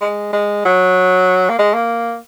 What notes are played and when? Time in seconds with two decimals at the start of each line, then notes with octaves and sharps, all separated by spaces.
0.01 G#3
0.33 G#3
0.65 F#3
1.49 A#3
1.59 G#3
1.74 A#3